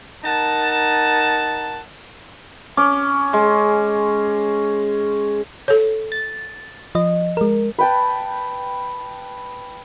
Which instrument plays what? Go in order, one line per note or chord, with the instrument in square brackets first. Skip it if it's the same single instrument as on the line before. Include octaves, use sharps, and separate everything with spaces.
[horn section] D#4 A#4 F#5 A5
[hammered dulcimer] C#4 D6
G#3
[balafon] A4 C#5
[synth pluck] A6
F3 D#5
G#3 A#4
[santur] B4 G5 A5